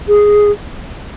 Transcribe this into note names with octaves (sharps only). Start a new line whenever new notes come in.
G#4